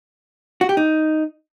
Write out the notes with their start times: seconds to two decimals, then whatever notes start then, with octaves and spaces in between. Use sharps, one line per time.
0.61 F#4
0.69 G4
0.77 D#4